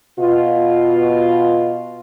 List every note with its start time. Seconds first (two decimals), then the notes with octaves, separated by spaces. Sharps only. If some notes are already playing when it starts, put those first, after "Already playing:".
0.19 B2 F4